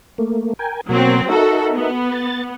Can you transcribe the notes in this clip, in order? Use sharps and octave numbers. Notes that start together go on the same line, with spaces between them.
A3 A#3
A#4 G5 G#5
B2 F#3 A#3 C4
D#4 F#4 A4 A#4 E5
B3
A6